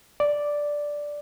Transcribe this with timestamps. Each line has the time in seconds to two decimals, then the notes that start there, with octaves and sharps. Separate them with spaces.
0.20 D5